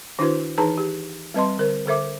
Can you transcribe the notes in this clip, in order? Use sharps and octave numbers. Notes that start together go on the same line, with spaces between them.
D#3 D4 E4 F#4 B4 C5
E3 D#4 G#4 B4 A5 A#5
G4
G3 C4 B4 D#5 A5 C6
D3 A#4 C5
D3 A4 C5 E5 D6